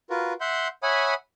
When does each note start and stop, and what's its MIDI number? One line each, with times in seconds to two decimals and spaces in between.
0.10 0.33 65
0.10 0.33 66
0.10 0.33 70
0.10 0.33 71
0.41 0.68 76
0.41 0.68 78
0.41 0.68 84
0.41 0.68 91
0.83 1.14 73
0.83 1.14 76
0.83 1.14 78
0.83 1.14 80
0.83 1.14 83
0.83 1.14 87